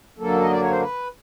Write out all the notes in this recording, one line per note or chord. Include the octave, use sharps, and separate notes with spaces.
F#2 D3 F#3 A#3 A4
D#5
D5
C#5
C5
B4